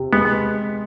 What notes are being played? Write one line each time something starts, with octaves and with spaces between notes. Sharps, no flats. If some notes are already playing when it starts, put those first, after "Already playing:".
Already playing: C3
G#3 B3